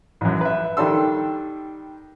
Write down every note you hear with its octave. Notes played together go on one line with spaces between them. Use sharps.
A1 F#2
B4 E5
D#3 G3 D4 A4 C6 E6